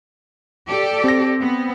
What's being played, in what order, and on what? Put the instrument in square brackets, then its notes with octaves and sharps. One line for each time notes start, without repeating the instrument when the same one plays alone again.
[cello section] G4 A4 D5
[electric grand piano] C4 A#6
[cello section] B3